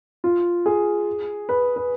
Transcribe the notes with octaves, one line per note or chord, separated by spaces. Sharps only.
F4
G#4
B4
B4